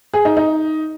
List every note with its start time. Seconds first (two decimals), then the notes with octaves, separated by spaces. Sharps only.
0.14 G#4
0.25 D#4
0.37 D#4